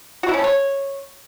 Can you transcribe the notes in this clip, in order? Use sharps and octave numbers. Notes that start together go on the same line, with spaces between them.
F#4
E4
C#4
A4
C#5